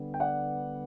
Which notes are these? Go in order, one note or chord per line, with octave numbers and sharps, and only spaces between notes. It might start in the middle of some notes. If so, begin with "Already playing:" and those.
Already playing: D3 G3 B3
G5
D5 F#5